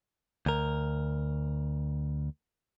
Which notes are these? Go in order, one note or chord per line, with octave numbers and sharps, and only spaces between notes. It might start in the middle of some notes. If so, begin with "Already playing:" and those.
D2 A#4